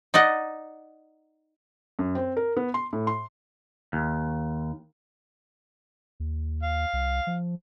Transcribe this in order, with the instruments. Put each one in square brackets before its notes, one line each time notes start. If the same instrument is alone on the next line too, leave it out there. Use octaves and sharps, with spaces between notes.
[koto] D#4 D5 D#5 F#5
[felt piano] F#2
C4
A#4
B3
C6
A2
C6
[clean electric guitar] D#2
[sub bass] D#2
[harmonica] F5
[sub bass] C2
F3